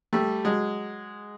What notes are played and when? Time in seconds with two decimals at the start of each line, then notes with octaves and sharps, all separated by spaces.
0.13 G3 A3
0.45 F#3 G#3